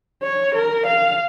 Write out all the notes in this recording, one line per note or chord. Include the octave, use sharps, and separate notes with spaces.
C#5
A#4
F5